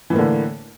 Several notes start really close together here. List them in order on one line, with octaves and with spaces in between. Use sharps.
E3 A2 A#3 D3